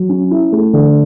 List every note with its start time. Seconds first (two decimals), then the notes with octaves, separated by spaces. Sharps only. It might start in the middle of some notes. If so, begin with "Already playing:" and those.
Already playing: F#3
0.09 C#4
0.31 E4
0.52 A3
0.73 D3